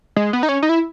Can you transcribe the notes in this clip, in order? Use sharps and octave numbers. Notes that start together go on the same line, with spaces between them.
G#3
B3
D#4
C#4
D#4
E4